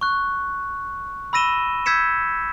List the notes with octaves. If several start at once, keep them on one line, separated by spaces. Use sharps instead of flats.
C#6 F#6
B5 E6 A#6 D#7 E7 G7
E6 G6 G#6 B6 C#7 E7